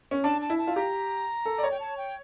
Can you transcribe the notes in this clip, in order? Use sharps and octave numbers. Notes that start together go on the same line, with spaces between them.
C#4
D4 A5
A5
E4
A5
F4
G4 A#5
A4
D5
C#5
G5
A5
G5